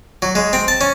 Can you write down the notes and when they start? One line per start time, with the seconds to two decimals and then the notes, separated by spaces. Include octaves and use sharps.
0.22 F#3
0.35 G#3
0.53 C4
0.68 A5
0.81 C#4